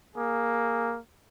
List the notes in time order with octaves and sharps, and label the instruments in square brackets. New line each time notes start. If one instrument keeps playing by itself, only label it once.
[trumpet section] A#3 G#4